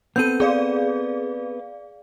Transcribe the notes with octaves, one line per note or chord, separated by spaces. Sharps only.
B3 C4 A4 G6 D#7
G#4 D5 F5